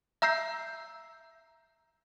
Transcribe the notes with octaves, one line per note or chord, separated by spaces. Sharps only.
E5 A#5 E6 G6 C7